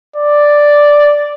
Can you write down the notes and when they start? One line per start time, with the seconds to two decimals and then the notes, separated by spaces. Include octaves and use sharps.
0.16 D5